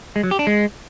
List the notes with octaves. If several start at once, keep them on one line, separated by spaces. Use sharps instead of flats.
G#3
F#3
G4
D4
G#3